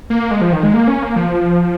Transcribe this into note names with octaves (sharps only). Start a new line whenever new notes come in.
A#3
G#3
F3
D#3
G#3
A#3
C#4
A#3
F3